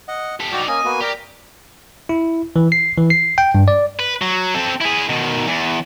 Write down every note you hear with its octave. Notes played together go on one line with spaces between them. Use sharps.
D#5 F#5
G4 A4
F#3 D#4 F#4 D5 G5
A#3 C#4 D#5 G#5
A#3 B3 F#4
G4 A#4 D5
E4
E3
C7
E3
C7
G5
G2
D5
B4
F#3
C4 A4
E4 G#4
B2 D#3
E2